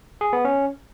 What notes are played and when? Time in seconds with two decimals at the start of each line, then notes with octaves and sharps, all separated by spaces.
0.21 G#4
0.33 B3
0.45 C#4